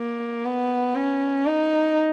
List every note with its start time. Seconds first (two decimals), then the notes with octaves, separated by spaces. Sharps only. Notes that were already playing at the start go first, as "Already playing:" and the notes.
Already playing: A#3
0.45 B3
0.95 C#4
1.46 D#4